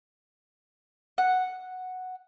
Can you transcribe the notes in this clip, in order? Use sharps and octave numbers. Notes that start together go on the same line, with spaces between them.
F#5